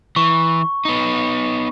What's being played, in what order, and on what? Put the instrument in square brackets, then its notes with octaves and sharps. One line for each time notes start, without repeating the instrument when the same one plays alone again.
[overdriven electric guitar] E3 [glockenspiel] C#6
[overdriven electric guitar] B3 D#4